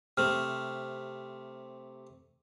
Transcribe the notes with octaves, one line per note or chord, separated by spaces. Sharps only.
C3 A3 F6